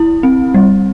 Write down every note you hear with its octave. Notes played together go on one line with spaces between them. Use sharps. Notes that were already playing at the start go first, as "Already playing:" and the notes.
Already playing: E4
C4
G3